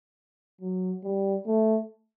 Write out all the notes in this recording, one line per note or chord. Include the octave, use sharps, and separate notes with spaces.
F#3
G3
A3